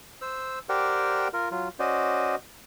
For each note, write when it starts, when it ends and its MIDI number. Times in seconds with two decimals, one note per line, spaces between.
0.22 0.59 72
0.22 0.59 88
0.69 1.28 67
0.69 1.28 70
0.69 1.28 72
0.69 1.28 74
0.69 1.28 78
0.69 1.28 79
1.33 1.49 65
1.33 1.49 70
1.51 1.68 54
1.51 1.68 65
1.79 2.35 61
1.79 2.35 66
1.79 2.35 72
1.79 2.35 74
1.79 2.35 75